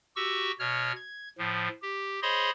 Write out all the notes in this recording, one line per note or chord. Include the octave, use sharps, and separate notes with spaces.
F#4 G4 C#6 E6
B2 C#5 F6
G#6
A2 F3
G4
G#4 C5 C#5 D#5 B5 C6